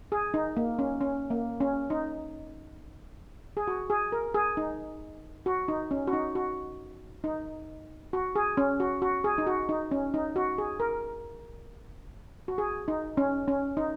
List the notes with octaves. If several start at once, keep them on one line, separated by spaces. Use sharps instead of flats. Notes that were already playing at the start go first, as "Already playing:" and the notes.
G#4
D#4
A#3
C#4
C#4
A#3
C#4
D#4
G#4
F#4
G#4
A#4
G#4
D#4
F#4
D#4
C#4
F#4
D#4
F#4
D#4
F#4
G#4
C#4
F#4
F#4
G#4
D#4
F#4
D#4
C#4
D#4
F#4
G#4
A#4
F#4
G#4
D#4
C#4
C#4
D#4